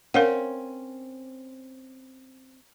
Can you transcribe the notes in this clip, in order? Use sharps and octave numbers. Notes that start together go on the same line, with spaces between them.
C4 C#4 A#4 F5 F#5